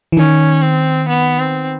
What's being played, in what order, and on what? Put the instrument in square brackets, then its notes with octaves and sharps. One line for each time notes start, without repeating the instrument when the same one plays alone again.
[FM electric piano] E3
[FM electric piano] D#3 [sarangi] C#4
[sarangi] C4
B3
C4